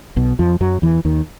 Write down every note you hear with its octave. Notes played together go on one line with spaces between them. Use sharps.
B1 B2
F2 F3
F#2 F#3
E2 E3
D#2 D#3